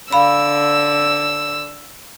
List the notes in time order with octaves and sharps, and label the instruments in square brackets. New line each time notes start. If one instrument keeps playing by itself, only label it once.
[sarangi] D3 [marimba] F5 B5 [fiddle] E6